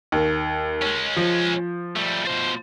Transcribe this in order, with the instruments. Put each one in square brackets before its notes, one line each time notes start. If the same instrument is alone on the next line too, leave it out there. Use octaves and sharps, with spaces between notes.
[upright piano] D#2
[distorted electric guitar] G#3 C#4
[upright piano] F3
[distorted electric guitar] G3 A3
B2 C5